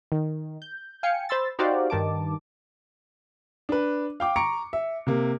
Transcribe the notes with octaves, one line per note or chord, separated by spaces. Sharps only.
D#3
G6
F5 G5 G#5 C#7
C5 B5 C6 E6 A6
D#4 F#4 G4 C5 D5 F5
G2 D#3 A5 D6
D4 B4
F5 G5 D6
A#5 C#6 C#7 D7
E5
C3 A#3